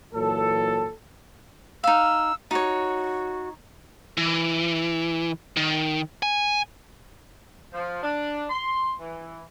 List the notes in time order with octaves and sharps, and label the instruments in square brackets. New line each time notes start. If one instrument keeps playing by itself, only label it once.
[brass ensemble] A#2 E3 F#3 A4
[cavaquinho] D#4 F5 [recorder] E6
[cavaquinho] D#4 C#5 [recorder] F#4
[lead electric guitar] E3
D#3
G#5
[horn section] F3
D4
C6
E3